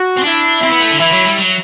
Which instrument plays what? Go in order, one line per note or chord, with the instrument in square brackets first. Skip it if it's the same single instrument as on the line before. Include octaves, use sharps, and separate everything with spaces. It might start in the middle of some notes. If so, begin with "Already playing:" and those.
Already playing: [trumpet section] F#4
[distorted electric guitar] C4
[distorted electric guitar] D4 [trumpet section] E4
[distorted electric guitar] C4 [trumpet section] E4
[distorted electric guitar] B3
A3
D3
[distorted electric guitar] E3 [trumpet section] E4
[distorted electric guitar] F#3
G3
F#3